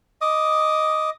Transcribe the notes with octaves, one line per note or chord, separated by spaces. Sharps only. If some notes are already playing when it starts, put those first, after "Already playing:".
D#5 D6 D#6